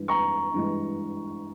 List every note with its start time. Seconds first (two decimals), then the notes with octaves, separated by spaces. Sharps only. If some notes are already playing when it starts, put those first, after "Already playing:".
Already playing: G2 E3 G#3
0.08 A#5 C#6
0.54 G2 E3 G#3